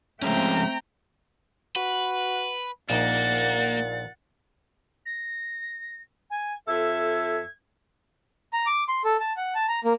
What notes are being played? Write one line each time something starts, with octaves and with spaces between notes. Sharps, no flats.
F3 G#3 A3 C4 C#4 E5 G5 A#5
F#4 B4
A#1 A#2 A#3 D#4 F#5 A6
A#6
G#5
F2 A4 E5 G#6
A#5
D6
C6
A4
A5
F#5
A5
A#5
A#3